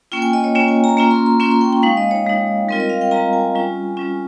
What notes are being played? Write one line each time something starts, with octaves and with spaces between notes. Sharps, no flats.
A#3 C#4 F4 G5
G#5
D#5
C#5
A#3 C#4 F4 C#5
G#5
A#5
A#3 C#4 F4 A#5
C6
C6
A#3 C#4 F4 C#6
C6
G5
G5
G#3 D#4 F5
D#5
C#5
G#3 D#4
G3 C4 F4 A#4
D#5
F5
G5
G3 C4 F4 A#5
G#5
G3 C#4 F4
G3 C#4 F4